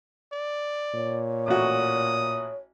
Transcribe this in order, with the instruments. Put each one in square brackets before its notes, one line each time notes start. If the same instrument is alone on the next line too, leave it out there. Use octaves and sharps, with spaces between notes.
[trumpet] D5
[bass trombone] A#2 [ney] C#5
[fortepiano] A1 F#4 [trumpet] D#6